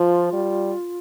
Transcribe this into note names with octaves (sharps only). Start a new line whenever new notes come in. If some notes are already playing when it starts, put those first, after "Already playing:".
Already playing: F3 F4
G3